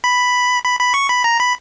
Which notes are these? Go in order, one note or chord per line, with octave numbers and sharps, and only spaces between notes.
B5
B5
B5
C#6
B5
A#5
B5